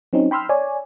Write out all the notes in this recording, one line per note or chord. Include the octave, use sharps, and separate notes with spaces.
F#3 C4 C#4 D#4
G5 B5 C6 E6 F6
C#5 D5 G#5